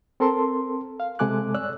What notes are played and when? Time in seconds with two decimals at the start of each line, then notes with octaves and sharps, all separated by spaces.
0.20 C4 A4 A#4 A5 C6
1.00 F5
1.19 C3 G#3 A4 G#5 D6 F#6
1.54 G2 C#5 D5 E6 F#6